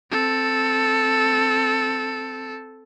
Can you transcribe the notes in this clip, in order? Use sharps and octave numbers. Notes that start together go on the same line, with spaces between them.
C4 A4